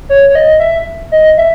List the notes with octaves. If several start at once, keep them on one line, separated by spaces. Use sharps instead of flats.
C#5
C#5
D#5
E5
D#5
E5